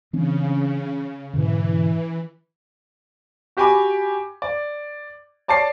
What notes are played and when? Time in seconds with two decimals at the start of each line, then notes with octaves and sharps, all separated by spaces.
0.13 C#3 E3 C4 D4
1.33 G#2 B2 D3 E3
3.57 F#4 G4 G5 G#5 B5 D6
4.42 D5
5.48 C#5 D5 A5 D6 C7